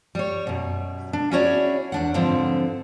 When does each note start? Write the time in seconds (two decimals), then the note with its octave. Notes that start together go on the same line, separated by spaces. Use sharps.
0.15 G3 C#5
0.47 F#2 B2
1.13 D4
1.31 C#4 E4 F#4 G#4 C#5 D5
1.92 E2 D4 F#5
2.14 G#2 D3 E3 F3 C4